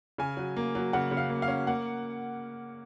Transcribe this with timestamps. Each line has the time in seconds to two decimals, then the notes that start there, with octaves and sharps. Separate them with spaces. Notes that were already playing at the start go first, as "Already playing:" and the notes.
0.18 C#3 G#5
0.37 F#3
0.57 A#3
0.75 F#3
0.93 C#3 F#5
1.11 C#3
1.17 F5
1.30 A#3
1.42 F5
1.48 C#4
1.67 A#3 F#5